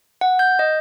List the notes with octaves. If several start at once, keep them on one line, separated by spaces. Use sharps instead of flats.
F#5
G6
D#5